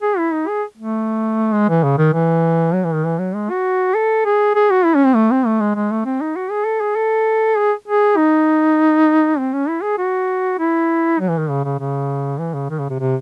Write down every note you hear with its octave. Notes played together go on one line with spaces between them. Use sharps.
G#4
E4
D#4
G#4
A3
G#3
E3
C#3
D#3
E3
F#3
E3
D#3
E3
F#3
G#3
F#4
A4
G#4
G#4
F#4
E4
C#4
C4
A3
C4
A3
G#3
G#3
A3
C4
D#4
F#4
G#4
A4
G#4
A4
G#4
G#4
D#4
C4
C#4
E4
G#4
F#4
E4
F#3
E3
D#3
C#3
C#3
C#3
E3
C#3
D#3
C#3
C3
C3